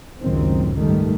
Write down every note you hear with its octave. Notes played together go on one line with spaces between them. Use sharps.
C#2 F#2 A2 D#3 F#3 C4
G#2 D#3 G3 A3